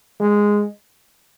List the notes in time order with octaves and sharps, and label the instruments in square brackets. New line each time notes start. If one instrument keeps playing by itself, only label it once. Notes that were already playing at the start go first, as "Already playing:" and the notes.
[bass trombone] G#3